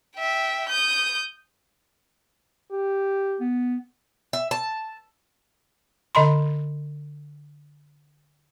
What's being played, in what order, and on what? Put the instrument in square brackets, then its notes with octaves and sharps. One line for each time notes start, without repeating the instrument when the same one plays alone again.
[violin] E5 G5
D#6 G6
[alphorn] G4
[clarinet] B3
[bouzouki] E5
A5
[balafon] D3 D#5 B5 C6